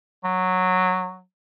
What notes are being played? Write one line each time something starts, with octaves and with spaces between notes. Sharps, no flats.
F#3